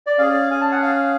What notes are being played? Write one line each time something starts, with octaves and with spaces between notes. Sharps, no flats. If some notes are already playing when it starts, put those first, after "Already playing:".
D5
C#4 G#4 F5
G#5
A5
F#5
F5